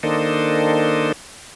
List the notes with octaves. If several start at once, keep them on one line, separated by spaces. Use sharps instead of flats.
D#3 A#3 D4 A4 C5 D#5